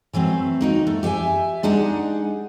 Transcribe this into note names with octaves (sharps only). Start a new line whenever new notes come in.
E3 F#3 A3 C4
A#3 D#4 F#4
A3
G4 E5 F5 G#5
G#3 D4 D#4 G#4 F#5